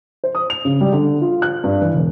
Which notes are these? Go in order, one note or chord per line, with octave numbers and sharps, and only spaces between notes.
C5
D#6
F7
C#3
G3
D3
F4
F#6
G2
E3
E1